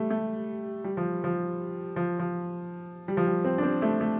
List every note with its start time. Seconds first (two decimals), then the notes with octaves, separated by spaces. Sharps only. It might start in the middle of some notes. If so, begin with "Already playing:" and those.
Already playing: G3 A3
0.10 A3
0.84 G3
0.97 F3
1.24 F3
1.96 F3
2.19 F3
3.08 G3
3.17 F3
3.27 G3
3.45 C4
3.58 D4
3.63 C4
3.82 A3
4.01 A3